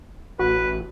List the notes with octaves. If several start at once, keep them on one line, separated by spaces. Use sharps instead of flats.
A1 F#4 B4